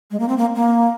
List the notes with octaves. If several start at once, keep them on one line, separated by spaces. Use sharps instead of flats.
G#3
A#3
C4
A#3
A#3